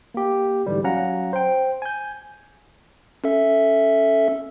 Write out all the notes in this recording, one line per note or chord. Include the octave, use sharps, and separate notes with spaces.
A#3 G4
G#2 D3 E3 G3
F#3 C#4 F5 F#5 A#5
C5 G5
G#5 G6
C#4 A4 E5